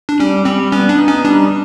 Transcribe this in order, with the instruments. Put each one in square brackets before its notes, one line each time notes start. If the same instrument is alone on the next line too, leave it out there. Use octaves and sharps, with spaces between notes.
[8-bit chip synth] D4
[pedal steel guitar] G3 [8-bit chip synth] C#4
[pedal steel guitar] G3 [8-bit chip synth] C4
[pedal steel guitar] B3 [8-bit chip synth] C#4
[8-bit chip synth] D4
[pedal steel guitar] D#4
[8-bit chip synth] C#4
[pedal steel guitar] G3 [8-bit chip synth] D4